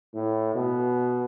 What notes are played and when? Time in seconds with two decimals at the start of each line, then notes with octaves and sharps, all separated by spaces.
0.14 A2
0.55 B2